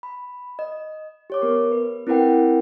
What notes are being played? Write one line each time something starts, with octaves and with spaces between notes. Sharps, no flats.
B5
D#5
G4 C#5 D6
B3 A#4
B4
C4 E4 A#4 B4 F#5 G5